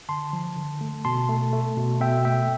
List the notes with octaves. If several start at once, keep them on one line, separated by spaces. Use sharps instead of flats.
D3 A5 C6
F3
D3
A3
B2 A5 C6
A3
A3
B2
B2 E5 G5
A3 E5 G5